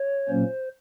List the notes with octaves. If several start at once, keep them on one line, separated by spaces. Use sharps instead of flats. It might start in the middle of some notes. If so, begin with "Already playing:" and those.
Already playing: C#5
A#2 F#3 A#3 C#4 C5